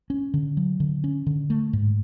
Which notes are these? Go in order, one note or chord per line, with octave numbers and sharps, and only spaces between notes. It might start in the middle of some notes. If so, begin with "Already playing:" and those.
C#4
D3
F#3
D3
C#4
D3
A3
G#2